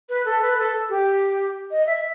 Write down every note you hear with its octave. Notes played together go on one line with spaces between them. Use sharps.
B4
A4
B4
A4
G4
D#5
E5